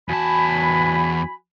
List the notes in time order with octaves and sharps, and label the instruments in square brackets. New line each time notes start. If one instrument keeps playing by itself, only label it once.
[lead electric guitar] E2 A5 [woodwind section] F#4 G#5 B5